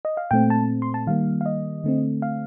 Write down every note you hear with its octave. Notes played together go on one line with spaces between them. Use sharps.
D#5
F5
A#2 A3 C4 G5
A5
C6
A5
D#3 G3 A#3 F5
F5
D#5
D3 A3 C4
F5